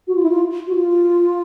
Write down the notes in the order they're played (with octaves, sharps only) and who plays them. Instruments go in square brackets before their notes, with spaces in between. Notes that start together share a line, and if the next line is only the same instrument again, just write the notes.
[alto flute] F#4
F4
E4
F4
F#4
F4